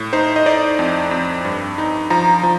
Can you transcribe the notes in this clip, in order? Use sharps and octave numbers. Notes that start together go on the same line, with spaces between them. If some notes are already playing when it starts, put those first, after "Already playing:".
Already playing: A2
D#4 C5
D#5
D#4 D5
F2
F2
G2
D#4
F3 A#5
F3